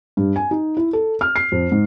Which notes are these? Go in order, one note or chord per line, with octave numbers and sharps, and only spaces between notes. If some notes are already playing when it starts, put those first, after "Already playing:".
G2
G#5
D#4
E4
A4
F6
C7
F2
G#2